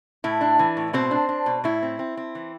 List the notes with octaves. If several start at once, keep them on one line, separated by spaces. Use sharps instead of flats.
A2 E4
D4
E3
A2
B2 C4 C5
D4
D4
B2
A2 E4
C4
C4
C4
E3